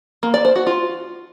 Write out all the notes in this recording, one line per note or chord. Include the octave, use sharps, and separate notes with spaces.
A#3
D5
C5
F#4
F4